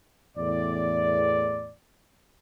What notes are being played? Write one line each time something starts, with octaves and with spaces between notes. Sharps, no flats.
E2 A2 D5